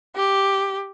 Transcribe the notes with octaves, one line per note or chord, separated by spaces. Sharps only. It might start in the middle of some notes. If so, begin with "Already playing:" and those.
G4